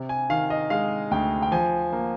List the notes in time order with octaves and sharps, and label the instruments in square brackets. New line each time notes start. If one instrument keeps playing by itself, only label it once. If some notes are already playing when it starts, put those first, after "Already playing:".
Already playing: [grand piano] C3
G#5
D#3 F5
D#5
G#3 F5
D2 G5
G5
F3 G#5
A#3